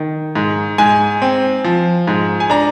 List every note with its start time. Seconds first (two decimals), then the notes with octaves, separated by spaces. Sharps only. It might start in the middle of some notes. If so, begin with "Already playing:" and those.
Already playing: D#3
0.35 G#2
0.78 G#2 G#5
1.22 C4
1.64 F3
2.07 G#2
2.40 G#5
2.50 D4 A#5